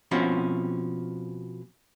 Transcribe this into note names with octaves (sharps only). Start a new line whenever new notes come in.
B2 F3 C4 C#4